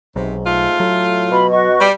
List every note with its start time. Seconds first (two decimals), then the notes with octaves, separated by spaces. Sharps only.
0.16 B1 G#2 C3
0.46 A3 F4
0.80 A2 F#3
1.31 B2 B5
1.50 F#4 D#5 C#6
1.80 G3